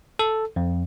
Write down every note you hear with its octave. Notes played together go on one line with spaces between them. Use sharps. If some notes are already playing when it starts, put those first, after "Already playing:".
A4
F2